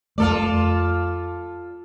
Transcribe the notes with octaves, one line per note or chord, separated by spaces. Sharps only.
F2 A3 F4 A4 D5